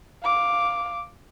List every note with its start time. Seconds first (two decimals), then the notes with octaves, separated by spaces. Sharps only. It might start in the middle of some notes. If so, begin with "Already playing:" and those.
0.23 F5 D6